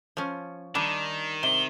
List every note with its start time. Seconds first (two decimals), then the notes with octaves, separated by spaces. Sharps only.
0.17 F3 C#4
0.75 D#3 G3 D4
1.43 C3 G7